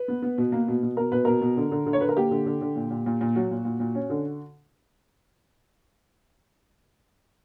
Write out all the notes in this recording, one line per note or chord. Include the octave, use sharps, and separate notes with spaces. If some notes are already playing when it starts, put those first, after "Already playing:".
Already playing: B4
B3
B3
B2
A#3
B2
B2
B2 A#4
B2 B4
B2 A#4
B2
D3
D3
D3
C#5
D3 B4
A#4
A#3 G4
D3
D3
D3
A#2
A#2
A#2
A#2
F#3 F#4
A#2
A#2
A#2
C#4
D3